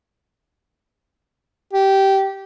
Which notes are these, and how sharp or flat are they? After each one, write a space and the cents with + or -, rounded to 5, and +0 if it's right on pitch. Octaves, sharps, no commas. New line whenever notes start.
G4 -15